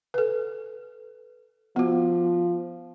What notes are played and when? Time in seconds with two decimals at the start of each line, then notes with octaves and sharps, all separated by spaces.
0.14 A4 B4
1.76 F3 B3 F#4